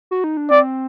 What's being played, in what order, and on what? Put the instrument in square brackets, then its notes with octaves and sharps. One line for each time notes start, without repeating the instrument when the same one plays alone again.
[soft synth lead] F#4
D#4
D4
[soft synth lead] C4 [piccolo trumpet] D5